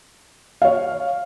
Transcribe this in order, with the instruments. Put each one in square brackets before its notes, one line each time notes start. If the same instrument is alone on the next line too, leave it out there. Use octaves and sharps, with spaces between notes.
[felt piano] C#5 F5